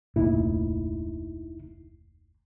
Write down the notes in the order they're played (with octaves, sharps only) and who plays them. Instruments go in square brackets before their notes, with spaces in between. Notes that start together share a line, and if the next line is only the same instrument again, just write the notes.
[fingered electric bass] F1 D2 A#2 [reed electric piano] D#4 E4